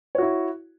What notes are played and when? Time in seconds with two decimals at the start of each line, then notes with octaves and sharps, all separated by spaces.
0.15 C#5
0.18 F#4
0.22 E4